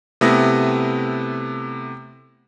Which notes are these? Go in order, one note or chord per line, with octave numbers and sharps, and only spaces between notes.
C3 A3 B3 E4 D#6 A#6